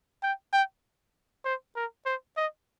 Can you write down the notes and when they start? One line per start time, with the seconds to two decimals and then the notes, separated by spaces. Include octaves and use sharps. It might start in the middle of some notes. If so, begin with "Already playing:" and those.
0.23 G5
0.53 G5
1.45 C5
1.76 A#4
2.06 C5
2.37 D#5